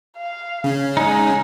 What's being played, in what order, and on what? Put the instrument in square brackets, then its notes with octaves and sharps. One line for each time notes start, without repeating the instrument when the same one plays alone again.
[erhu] F5
[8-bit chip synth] C#3 C#4
[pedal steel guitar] G#3 D#4 [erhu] G#5